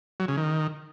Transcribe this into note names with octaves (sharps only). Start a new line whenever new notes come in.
F#3
C#3
D#3